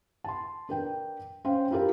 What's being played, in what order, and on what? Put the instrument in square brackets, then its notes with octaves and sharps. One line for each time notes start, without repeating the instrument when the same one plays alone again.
[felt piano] A5 C6
D4 A#4 B4 G5
C#4 C5 F5 G5
E4 F4 G4 A#4